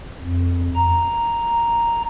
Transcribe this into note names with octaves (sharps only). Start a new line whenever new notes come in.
F2
A#5